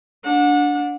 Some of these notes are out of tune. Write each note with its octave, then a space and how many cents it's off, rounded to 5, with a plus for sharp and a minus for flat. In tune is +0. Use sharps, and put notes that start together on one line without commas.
D4 -10 F#5 -30